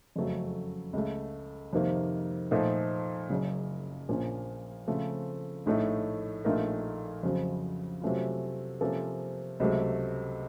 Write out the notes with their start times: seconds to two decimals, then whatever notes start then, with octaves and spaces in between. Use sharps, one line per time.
0.16 F#1 F2 C#3 F#3 A3
0.93 C#2 C#3 A3
1.73 F2 C3 D#3 A#3
2.51 A#2 F3 A3 D#4 A4
3.29 F#1 F#2 C#3
4.09 A#1 A#2 F3 A#3 C#4
4.87 C#3 F3 A3 C4 F4
5.66 A#1 A2 A3 D#4
6.45 A#1 A#2 A3 D#4 A#4
7.23 F2 C#3 F#3 C4
8.02 C3 F#3 A3 C#4 F4
8.81 C3 F3 A#3 C#4 A4
9.60 C#2 C3 F#3 A3